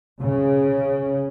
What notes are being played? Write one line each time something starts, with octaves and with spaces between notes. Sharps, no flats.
C#3